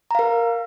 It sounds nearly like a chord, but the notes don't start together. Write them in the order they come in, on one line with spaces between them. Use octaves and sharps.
A#5 F5 A#4